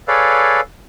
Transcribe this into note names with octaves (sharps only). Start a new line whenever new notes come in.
G#4 A4 B4 C#5 D5 F5